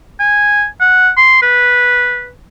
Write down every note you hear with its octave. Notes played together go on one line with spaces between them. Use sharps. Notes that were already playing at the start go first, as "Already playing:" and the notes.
G#5
F#5
C6
B4